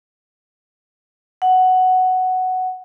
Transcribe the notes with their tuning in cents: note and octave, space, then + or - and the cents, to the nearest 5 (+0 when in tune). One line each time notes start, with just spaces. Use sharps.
F#5 +5